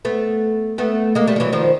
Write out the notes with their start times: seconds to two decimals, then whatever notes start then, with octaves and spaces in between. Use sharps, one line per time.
0.05 A3 B3
0.78 A3 B3
1.15 G#3 A#3
1.27 G3 A3
1.36 F3
1.40 E3 F#3
1.53 D#3 F3